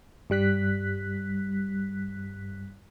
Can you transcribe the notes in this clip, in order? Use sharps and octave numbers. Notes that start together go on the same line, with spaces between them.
G2 G3 F#6 B6